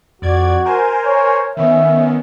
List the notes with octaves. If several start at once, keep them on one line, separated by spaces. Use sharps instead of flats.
F2 F#4 D5 G#6
A#4 C5 G#5
C#5
D#3 B3 C#4 E5